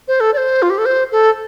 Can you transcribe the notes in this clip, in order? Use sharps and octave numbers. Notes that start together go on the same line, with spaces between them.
C5
A4
D5
C5
F4
G4
A4
C5
A4